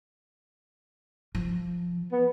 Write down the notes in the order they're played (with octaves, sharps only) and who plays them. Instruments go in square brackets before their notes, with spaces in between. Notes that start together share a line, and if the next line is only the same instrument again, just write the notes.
[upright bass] F3
[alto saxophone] B3